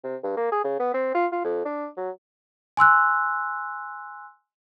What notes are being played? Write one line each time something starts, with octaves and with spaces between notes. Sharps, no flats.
C3
G2
A#3
G#4
C#3
B3
C4
F4
F4
F2
D4
F#3
G#5 C6 E6 F#6